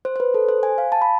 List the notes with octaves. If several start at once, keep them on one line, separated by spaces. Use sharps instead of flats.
C5
C5
B4
A4
C5
G#5
F5
A5
B5